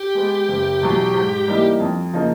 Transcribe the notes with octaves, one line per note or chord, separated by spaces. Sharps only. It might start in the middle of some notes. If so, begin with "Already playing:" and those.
Already playing: G4
G#3 B3
F#1
E2 B2 F#3
G#2
E3 G3 A#3 D#4
F2
C#3 F3 A#3 D#4